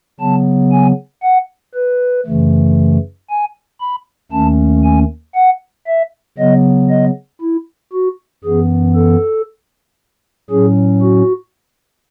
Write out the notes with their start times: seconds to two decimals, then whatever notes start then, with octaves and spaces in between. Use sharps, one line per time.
0.20 C#3 F#3 B3 A5
0.71 G#5
1.23 F#5
1.74 B4
2.26 F#2 C#3 E3 A3
3.29 G#5
3.80 B5
4.32 D#2 D#3 A3 C#4 A5
4.83 G#5
5.35 F#5
5.87 E5
6.38 C#3 F#3 B3 D#5
6.89 D#5
7.41 E4
7.93 F#4
8.44 F#2 E3 B3 G#4
8.95 A4
10.50 A2 F#3 C#4 G#4
11.02 F#4